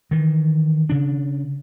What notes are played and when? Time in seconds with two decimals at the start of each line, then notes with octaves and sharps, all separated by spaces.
0.11 D#3 E3
0.89 C#3 D4